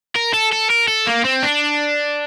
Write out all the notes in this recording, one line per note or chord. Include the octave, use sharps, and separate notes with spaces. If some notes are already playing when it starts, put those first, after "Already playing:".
A#4
A4
A4
A#4
A4
A#3
C4
D4